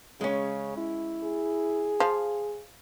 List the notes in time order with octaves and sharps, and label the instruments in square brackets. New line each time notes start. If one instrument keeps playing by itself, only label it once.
[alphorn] C#3 [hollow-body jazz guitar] G#3 C#4
[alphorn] E4
[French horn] G#4
[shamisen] F3 [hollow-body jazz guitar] F5